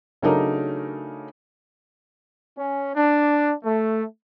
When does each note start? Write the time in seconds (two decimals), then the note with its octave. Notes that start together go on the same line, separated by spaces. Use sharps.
0.22 C#3 F#3 A3 D4 D#4 A#4
2.58 C#4
2.95 D4
3.64 A3